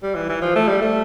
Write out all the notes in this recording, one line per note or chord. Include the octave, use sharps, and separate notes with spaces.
G3
E3
E3
F3
A3
G3
A3